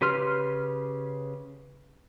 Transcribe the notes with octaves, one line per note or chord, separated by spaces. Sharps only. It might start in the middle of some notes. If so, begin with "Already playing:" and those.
C#3 G4 B4 C6 F6